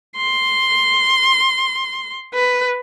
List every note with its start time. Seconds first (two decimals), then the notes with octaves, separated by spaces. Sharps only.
0.17 C6
2.34 B4